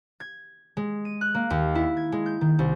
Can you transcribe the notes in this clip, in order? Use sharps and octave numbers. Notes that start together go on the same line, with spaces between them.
G#6
G#3
D#7
F#6
A#3
D#2
E4
G#6
G#3
G6
D#3
C2